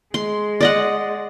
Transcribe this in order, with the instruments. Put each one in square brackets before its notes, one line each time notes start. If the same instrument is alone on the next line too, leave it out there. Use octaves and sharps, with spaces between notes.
[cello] G#3 [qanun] C6
[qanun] D5 D#5 F#5